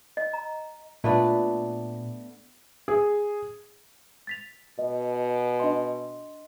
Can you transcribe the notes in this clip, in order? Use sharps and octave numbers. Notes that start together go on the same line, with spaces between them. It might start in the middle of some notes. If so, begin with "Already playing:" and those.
D#5
A#5
A#2 A3 B3 D4
G#4
A6 B6 F7
B2 D#5
D4 D#5 C6